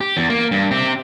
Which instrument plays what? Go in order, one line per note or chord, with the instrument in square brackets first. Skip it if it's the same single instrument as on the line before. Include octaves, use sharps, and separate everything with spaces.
[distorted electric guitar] G4
E2
A#3
G2
C4 G4